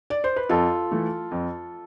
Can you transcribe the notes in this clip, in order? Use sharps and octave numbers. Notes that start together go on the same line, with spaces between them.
D5
C5
B4
F2 F4 A4
E3 A3
F2